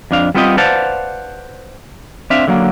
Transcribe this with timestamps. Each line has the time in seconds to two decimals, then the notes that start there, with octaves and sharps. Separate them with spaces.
0.11 F2 D4 F5
0.35 G3 B3 C4 F4 G4 D#5
0.58 B4 C5 D5 F5 F#5 A5
2.30 C4 D4 E5 F5
2.47 D3 F#3 A#3